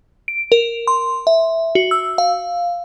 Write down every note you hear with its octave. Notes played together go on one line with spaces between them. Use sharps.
D7
A#4
C6
E5
F#4
E6
F5